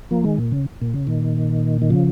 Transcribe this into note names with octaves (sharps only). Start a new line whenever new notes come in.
F3 A#3
D#3 G#3
A#2
C#3
A#2
C#3
A#2 D#3
D#3
C#3 F3